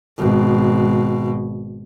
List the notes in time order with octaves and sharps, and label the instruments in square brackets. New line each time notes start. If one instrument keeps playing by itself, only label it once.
[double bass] G#1 B2